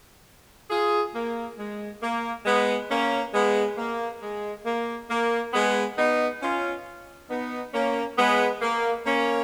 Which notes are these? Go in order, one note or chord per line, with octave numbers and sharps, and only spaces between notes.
F4 G#4
A#3
G#3
A#3
G#3 B3
A#3 C#4
G#3 B3
A#3
G#3
A#3
A#3
G#3 B3
B3 D#4
C#4 F4
B3 D#4
A#3 C#4
G#3 B3
A#3
A#3 C#4